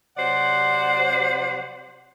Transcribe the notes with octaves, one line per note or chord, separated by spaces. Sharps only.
C3 F#3 C5 D5 F#5